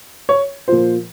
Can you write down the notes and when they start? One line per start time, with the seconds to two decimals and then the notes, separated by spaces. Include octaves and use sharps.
0.29 C#5
0.68 A#2 F3 C5